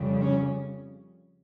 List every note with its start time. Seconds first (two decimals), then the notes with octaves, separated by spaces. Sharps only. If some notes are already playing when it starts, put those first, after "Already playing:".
Already playing: F2 C#3 G3
0.21 C#4